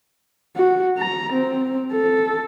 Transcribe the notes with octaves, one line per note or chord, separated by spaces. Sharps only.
F#4
A#5
C4
A4